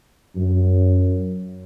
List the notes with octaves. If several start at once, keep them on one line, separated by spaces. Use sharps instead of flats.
F#2